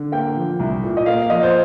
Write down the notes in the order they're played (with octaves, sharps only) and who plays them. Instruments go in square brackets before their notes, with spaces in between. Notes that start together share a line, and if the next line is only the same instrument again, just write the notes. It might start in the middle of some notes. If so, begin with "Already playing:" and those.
Already playing: [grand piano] D3
[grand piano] A#3 [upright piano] G5
[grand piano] F3
C2
A#2
[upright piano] D#5
[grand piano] A#3 [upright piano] F5
[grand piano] F3 [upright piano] D#5
[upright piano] C5